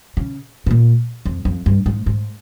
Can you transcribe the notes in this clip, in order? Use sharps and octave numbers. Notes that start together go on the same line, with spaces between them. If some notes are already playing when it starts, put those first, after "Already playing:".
C#3
C3
A#2
F2
F2
G2
G#2
G#2